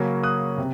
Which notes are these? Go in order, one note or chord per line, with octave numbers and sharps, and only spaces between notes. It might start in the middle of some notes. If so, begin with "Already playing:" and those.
Already playing: C#3 F#3 A#3 C#4
D#6 F#6
C3